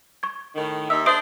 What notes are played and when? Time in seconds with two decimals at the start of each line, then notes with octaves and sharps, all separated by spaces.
0.23 C#6 G#6
0.55 A2 D#3
0.90 D#2 D#4 E5 E6
1.06 D4 G#4 C5 E5 D#6 D7